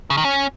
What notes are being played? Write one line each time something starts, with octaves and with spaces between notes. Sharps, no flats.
C#3
D#3
C#4